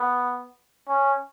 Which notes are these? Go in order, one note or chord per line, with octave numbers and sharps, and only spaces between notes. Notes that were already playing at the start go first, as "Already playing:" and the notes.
Already playing: B3
C#4